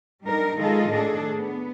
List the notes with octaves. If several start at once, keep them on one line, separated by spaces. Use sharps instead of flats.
G3 D4 D#4 A#4
D#3 G#3 F4 G#4 A4 D#5
A2 D#3 D4 G#4 A4
B3